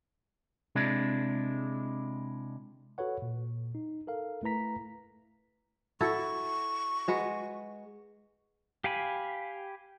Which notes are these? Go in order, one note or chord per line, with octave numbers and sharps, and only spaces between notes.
C3 G#3 D4 E4
F#4 A4 B4 C#5 F#5
A#2
D#4
A4 A#4 F5
A3 E4 B4 A#5 B6
E4 F#4 A4 C#6
G#3 F#4 B4
G4 F5 G5 G#5 B5